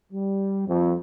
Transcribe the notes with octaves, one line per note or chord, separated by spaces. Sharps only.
G3
F2